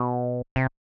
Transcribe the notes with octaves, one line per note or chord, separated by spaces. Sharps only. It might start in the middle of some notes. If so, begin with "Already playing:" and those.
Already playing: B2
C3